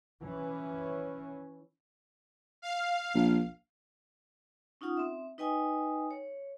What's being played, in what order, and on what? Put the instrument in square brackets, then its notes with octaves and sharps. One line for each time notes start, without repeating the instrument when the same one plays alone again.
[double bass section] E3 C#4
[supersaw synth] F5
[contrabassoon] A#1
[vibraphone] C#4 D#4 F4 F#5 D#6
C4 E5
D#4 B4 D#5 G5 G#5 D#6
C#5